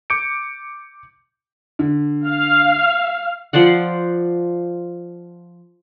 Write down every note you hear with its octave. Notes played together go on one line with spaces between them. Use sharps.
D6 G6 C#7 D7
D3
F5
F3 C5 D5 F#5